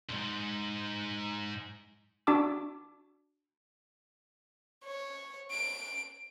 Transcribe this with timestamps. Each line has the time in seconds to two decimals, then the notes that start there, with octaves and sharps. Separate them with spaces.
0.09 F2 G#2
2.27 D4 F#4 A5 D6 E6
4.84 C#5
5.51 D7